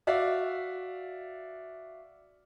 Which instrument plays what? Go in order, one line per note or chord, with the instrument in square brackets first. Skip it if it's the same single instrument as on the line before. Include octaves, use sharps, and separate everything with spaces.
[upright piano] F#4 D5 E5 F5